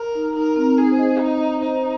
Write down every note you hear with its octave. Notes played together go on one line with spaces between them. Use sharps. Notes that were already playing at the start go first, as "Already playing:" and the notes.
Already playing: A#4
D#4
D#4 A#4
C4
D#4 G#4
C5
D#5
D#4
D#5
D#4 C5